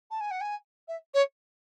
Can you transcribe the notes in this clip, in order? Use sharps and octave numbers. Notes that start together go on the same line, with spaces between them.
A5
G#5
F#5
G#5
E5
C#5